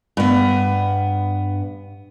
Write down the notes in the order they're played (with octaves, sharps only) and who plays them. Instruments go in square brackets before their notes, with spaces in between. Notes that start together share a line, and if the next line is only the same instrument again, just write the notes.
[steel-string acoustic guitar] G2 B3